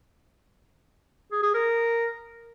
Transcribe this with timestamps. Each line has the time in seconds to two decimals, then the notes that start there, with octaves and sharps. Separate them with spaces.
1.32 G#4
1.43 G#4
1.54 A#4